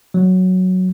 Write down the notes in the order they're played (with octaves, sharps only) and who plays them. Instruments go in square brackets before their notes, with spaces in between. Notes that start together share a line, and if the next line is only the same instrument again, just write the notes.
[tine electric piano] F#3